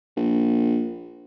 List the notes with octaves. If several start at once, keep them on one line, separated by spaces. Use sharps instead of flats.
A#1